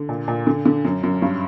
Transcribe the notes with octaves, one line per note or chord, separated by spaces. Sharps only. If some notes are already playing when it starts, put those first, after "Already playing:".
Already playing: D3
A#2
A#2
D3
D3
F#2
F#2
G2